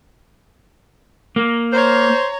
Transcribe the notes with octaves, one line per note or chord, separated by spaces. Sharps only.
A#3
C5 C#5 A#5